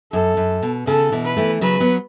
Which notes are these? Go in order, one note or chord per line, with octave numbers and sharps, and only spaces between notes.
F#2 A4
F#2
B2
C#3 A4
B2 E3
B4
E3 A3
C#3 F#3 B4
F#3 B3